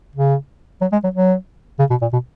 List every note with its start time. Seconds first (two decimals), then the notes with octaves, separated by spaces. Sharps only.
0.15 C#3
0.81 F#3
0.92 G#3
1.04 F#3
1.14 F#3
1.79 C#3
1.90 B2
2.02 A#2
2.13 B2